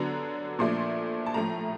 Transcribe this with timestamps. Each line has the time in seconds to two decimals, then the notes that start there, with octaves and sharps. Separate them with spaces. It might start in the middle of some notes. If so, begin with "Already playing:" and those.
Already playing: D3 F#3 B3 D4 A#5
0.59 A#2 F3 A3 D4 C6
1.26 A5
1.34 A2 F3 A3 A#5